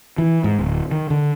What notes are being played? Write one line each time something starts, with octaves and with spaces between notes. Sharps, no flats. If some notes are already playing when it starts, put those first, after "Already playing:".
E3
G#2
D1
D#3
D3